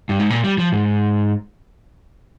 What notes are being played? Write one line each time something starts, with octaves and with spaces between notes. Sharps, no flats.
G2
G#2
A#2
G3
F3
G#2